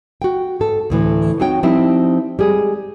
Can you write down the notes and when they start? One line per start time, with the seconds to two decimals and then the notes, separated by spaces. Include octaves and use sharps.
0.22 F#4 G5
0.60 G#2 A4
0.90 D2 A2 E3
1.40 C4 D#4 F#4 C#5 G5
1.63 F3 G3 C4 D#4 E4
2.39 G3 G#3 G#4